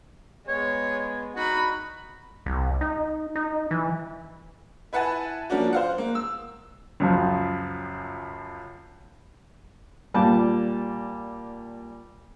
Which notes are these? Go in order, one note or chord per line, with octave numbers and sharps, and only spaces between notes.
G#3 B3 C#5
D#4 F#4 B5
C2
D#4
D#4
E3
E4 B4 F#5 G#5 A5
F3 A#3 C#4 D4 F#4
C5 F5 F#5
A#3
E6
C#2 F#2 F3
A#2 G3 A5